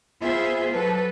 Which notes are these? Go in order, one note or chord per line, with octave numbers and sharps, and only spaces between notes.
B3 F4 G#4 C5 E5
F#3 A4 B4